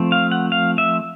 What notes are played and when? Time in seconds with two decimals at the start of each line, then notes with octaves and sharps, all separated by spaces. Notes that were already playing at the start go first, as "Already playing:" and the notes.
Already playing: F3 A3 C4
0.12 F5
0.32 F#5
0.52 F5
0.78 E5